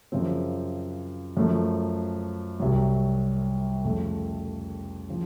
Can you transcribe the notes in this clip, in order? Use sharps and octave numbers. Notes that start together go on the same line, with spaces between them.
F#2 C#3 F3 C4
F#2 F3 A3
C2 C3 F#3
F2 C#3 A3
C#3 F3